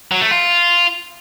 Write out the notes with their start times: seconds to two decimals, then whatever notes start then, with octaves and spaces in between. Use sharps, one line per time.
0.12 F#3
0.21 A3
0.31 F4